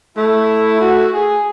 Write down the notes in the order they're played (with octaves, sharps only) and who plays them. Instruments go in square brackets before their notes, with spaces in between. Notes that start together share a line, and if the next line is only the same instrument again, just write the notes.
[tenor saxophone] A3 [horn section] E4
[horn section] F#4
G#4